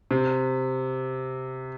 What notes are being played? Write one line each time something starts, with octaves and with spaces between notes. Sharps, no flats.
C3